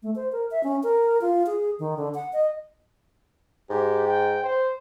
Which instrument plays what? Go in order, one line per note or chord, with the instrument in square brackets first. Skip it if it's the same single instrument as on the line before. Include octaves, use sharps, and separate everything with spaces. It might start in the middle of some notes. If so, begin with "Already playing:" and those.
[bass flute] A3
C5
A#4
E5
C#4
A#4
F4
G#4
D#3
D3
F#5
D#5
[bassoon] G#2 [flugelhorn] G4
[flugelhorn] G5
C5